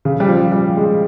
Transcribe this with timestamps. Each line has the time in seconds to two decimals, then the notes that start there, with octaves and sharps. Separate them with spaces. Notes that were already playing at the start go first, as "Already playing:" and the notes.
0.05 C#3
0.20 G3
0.28 F3
0.52 G3
0.77 G#3